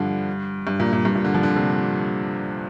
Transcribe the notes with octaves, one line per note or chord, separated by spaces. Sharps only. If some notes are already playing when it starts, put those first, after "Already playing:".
Already playing: G2 D3 F3
G2
A#2
A#2
G2
A#2
D3
F3
D3
C3